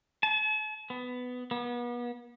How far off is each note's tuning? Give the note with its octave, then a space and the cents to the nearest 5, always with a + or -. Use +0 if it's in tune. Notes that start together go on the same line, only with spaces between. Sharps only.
A5 -45
B3 +10
B3 -35